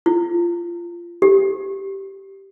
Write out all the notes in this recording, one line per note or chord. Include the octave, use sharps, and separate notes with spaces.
F4
G4